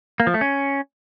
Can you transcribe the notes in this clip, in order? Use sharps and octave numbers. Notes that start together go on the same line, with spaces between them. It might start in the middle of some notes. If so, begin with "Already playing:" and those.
A#3
F3
A3
C#4